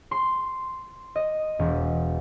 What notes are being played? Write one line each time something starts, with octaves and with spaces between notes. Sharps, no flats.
C6
D#5
E1